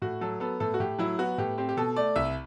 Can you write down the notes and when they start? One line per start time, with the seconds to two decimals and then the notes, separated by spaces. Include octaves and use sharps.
0.02 A2 F#4
0.21 F#3 A4
0.40 B3 A4
0.60 A2 A4
0.74 F#4
0.80 A2 G4
0.99 F#3 E4
1.19 B3 F#4
1.38 A2 G4
1.58 C4 G4
1.69 G4
1.77 B2 A4
1.96 A3 D5
2.16 C2 E5